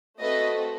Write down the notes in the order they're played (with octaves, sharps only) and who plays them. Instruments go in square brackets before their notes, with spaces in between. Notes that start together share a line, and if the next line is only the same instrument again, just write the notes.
[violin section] A3 C4 F#4 A4 B4 D#5